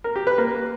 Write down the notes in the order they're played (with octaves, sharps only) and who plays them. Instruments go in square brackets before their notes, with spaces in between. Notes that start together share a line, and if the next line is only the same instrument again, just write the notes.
[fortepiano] A#4
G4
B4
A#3